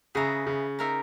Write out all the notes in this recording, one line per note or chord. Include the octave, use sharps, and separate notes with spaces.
C#3 G#4 B4 E5 A#5
C#3
D#4 A#4 E5 A#5